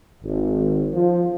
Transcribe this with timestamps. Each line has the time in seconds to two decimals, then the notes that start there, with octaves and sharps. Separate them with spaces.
0.22 G#1
0.93 F3